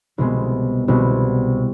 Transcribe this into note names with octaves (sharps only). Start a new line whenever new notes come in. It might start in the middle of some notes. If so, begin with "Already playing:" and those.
C2 B2 G#3 B3
C2 B2 G#3 B3